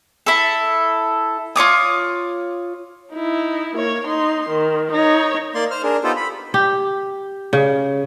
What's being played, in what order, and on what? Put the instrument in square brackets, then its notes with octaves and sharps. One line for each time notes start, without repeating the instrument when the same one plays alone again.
[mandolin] E4 A4
F4 C#5 D6 D#6
[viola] D#4 E4
A#3 C#5
D#4 C6
D#3
D#4 C#5
[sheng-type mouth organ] A#3 D5 C6
C5 F6
D4 G#4 A#4
B3 D#4 F4 G4 A4 C5
B5
[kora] G4
C#3